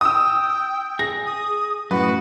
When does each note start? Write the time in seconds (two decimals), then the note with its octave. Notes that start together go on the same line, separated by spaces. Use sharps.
0.01 G5 D#6 E6
0.99 G#4 A#6
1.26 D#6
1.91 F#2 A2 F#4 B4